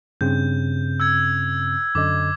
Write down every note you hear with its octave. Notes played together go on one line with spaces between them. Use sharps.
G2 C#3 C4 G6
E6 G6 G#6
F#2 D3 D#5 D6